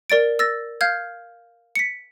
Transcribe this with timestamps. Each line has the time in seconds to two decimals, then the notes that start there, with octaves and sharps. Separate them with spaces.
0.10 A#4 D5 A6 D7
0.39 E6 A6 A#6
0.81 F5 F6 G6 G#6
1.75 B6 C#7